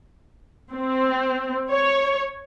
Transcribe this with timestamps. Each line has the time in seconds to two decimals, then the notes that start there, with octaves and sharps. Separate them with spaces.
0.72 C4
1.70 C#5